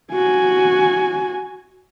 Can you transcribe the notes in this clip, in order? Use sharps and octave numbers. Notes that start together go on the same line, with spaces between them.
F#4 G#5